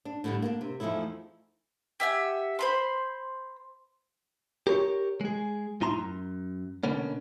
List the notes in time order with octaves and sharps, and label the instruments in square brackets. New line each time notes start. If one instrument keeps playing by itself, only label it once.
[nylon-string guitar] D4
A2 D3 G3
A#3 C4 D4
C3
E2 F3 A3 D#4 E4
[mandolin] G4 E5 F#5 G#5
C5 B5 C6
[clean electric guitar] G4 A#4 C5 C#5
G#3 G#4
A2 D#4 E4 A#5 C6
F#2
B2 D3 A#3 B3 C#4